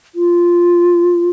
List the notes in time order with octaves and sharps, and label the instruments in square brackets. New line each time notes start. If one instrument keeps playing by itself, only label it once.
[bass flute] F4